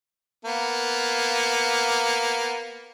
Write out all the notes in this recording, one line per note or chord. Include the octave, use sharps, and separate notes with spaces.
A#3 B3